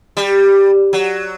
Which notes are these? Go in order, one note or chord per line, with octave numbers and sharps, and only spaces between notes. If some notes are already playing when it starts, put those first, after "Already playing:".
G3
F#3